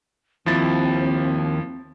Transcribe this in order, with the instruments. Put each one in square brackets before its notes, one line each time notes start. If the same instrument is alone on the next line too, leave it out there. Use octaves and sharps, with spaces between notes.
[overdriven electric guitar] D#2 [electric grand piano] F3 E4 A6 [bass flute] C4